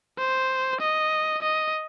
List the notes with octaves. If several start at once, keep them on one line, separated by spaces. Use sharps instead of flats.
C5
D#5
D#5